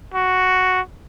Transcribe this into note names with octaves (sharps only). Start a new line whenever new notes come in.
F#4